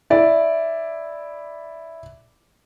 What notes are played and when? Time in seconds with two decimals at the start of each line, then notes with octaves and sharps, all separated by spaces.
0.10 E4 D5